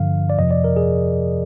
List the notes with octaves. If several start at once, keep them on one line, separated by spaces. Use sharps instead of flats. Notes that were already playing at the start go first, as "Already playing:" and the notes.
Already playing: G2 D3 F3 F5
D5
F2 C3 F3 D#5
D5
A#4
G#4